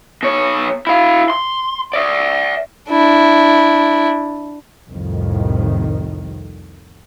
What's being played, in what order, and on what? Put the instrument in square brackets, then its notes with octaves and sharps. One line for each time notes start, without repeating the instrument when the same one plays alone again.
[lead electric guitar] B2 C#5
E4 F5
C6
D5 E5
[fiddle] D4 E4
[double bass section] C2 F2 A2 D#3